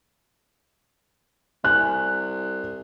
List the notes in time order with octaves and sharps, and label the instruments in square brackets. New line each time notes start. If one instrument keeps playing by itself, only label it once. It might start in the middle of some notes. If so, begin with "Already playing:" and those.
[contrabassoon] C2 [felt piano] G#5 F#6